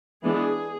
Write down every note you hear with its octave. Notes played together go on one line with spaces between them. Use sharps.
E3 G#3 B3 D4 G#4